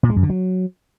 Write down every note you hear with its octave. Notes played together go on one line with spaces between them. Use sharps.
A#2
G#3
F#2
D3
F#3